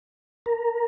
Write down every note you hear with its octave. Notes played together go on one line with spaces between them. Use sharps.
A#4